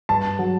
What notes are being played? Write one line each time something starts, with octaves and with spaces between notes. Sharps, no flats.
G2 A5
F#3